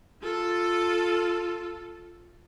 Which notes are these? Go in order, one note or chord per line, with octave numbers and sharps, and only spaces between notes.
F4 A4